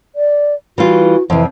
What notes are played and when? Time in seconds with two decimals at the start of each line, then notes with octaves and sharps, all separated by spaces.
0.16 D5
0.78 E3 G3 F4 F#4
1.30 F2 C3 E3